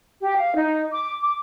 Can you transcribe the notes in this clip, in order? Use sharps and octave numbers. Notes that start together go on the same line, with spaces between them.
G4
F5
D#4
D6
D6